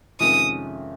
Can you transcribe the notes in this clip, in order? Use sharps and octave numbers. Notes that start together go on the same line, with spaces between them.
F2 C3 D#3 G#3 C#4 D#6